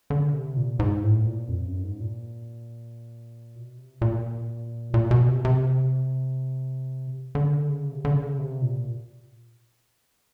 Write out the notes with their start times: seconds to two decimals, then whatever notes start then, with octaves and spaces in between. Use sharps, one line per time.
0.10 D3
0.33 C3
0.56 A#2
0.79 G#2
1.03 A2
1.26 A#2
1.49 F2
1.66 F#2
1.83 G#2
2.00 A#2
3.55 B2
3.78 C3
4.02 A#2
4.94 A#2
5.11 B2
5.29 C3
5.45 C3
7.35 D3
7.69 C#3
7.92 C3
8.05 D3
8.15 C#3
8.39 C3
8.62 A#2